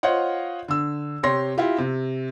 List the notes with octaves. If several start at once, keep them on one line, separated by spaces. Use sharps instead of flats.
F4 C5 C#5 D#5 F#5
D3 E6
C3 G4 C#5 C6 A#6
E4 F4 G4
C3